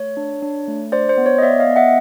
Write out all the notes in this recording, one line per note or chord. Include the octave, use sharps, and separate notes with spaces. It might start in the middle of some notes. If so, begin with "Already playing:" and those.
Already playing: A3 C#5
D4
D4
A3
D4 C5 D5
C5
B3
C#5
D#5
B3 D5 E5
D#5 F5
B3
E5 F#5